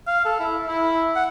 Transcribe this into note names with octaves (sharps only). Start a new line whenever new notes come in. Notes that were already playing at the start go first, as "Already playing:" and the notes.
F5
A4
E4
E4
F#5